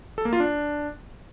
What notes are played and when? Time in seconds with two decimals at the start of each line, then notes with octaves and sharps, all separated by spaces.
0.18 A4
0.25 A#3
0.33 F4
0.40 D4